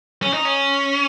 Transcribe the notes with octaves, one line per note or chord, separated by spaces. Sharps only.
C#4
D#4
C#4